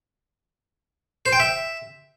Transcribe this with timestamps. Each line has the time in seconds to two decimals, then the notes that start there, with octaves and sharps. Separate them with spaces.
1.26 C5
1.33 G5
1.40 E5